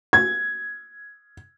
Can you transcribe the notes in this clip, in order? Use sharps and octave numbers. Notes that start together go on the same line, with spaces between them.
G#6